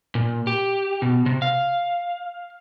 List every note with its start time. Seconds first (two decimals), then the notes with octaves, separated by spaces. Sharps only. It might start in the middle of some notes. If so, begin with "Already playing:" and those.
0.15 A#2
0.47 G4
1.02 B2
1.26 C3
1.42 F5